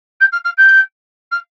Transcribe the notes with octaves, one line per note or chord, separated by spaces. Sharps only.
G6
F6
F6
G6
F6